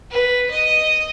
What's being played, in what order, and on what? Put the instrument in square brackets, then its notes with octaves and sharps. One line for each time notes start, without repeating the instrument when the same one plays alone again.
[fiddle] B4
D#5